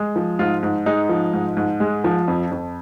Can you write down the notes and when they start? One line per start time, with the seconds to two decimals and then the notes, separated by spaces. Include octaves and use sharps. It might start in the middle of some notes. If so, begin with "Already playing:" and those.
Already playing: G#3
0.16 F3
0.39 G#2 F4
0.63 G#2
0.86 G#3 D#4
1.09 F3
1.33 G#2
1.57 G#2
1.80 G#3
2.04 F3
2.28 F2
2.51 F2